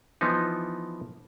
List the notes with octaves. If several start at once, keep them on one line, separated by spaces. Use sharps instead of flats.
E3 F3 B3 D#4